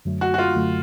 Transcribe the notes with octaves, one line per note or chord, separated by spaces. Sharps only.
F#2 D3 F#3 A3
F#4
F#4
F4
F#2 D3 F#3 A3